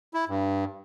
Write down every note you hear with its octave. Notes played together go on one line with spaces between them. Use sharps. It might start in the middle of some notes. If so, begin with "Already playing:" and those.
E4
G2